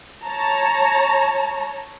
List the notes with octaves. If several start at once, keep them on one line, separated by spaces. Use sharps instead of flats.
C#5 A5 A#5